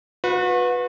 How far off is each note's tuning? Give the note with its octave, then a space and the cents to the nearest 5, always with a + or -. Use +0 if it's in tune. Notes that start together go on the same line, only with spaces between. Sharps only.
F#4 -40 B4 +0